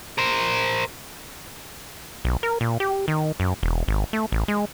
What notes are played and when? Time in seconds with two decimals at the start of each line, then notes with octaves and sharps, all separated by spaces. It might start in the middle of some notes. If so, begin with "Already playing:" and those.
0.18 A#4 C5
2.25 B1
2.43 A#4
2.61 A#2
2.80 G4
3.08 D#3
3.40 F#2
3.63 E1
3.88 G#1
4.13 A3
4.32 A1
4.48 G#3